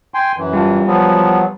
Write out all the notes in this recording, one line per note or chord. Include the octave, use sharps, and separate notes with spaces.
G5 G#5 C6
F#2 E3
G3 F4 A5
F3 F#3 B3